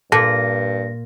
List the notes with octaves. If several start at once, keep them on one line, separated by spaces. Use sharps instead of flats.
G2 A#2 A4 A#6